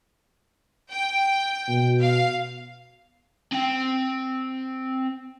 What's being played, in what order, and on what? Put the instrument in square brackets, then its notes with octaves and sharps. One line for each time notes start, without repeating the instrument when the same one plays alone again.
[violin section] G5
[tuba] B2
[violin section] F5
[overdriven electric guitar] C4 G5